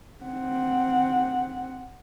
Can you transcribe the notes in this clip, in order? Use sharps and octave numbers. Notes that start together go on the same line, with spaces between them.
C4 F#5